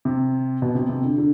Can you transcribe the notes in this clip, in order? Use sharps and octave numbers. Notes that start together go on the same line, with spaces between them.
C3
B2
C3
C3
D3
D3